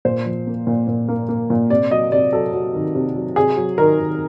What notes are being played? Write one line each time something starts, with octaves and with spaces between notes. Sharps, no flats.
A#2 C5
F3
A#3
A#2
A#2
A#3
A#3
A#2
C3 D5
F#3 D#5
C3 D5
F#3 A4
F#3
D#3
C3
F#3
C3 G#4
F#3
D#3 A#4
D#3